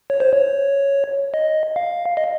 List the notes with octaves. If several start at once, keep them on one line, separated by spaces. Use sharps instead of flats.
C#5
C5
C#5
D#5
F5
D#5